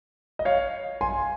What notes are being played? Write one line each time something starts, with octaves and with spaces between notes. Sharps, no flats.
D#5
C#5 F5
G#5 C6